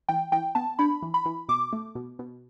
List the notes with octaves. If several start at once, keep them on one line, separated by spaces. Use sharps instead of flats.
E3 G5
E3 G5
B3 A5
D4 B5
E3
B5
E3
B2 D6
A3
B2
B2